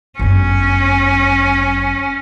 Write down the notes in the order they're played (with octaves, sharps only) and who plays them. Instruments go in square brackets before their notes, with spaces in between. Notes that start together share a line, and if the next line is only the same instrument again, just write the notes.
[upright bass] G1 F#2 [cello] C#4